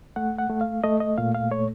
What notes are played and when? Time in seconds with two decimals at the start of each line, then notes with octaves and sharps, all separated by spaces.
0.16 A3 F#5
0.38 F#5
0.50 A3
0.61 F5
0.84 A3 D#5
1.00 D#5
1.18 A#2 F5
1.35 F5
1.51 A3 C#5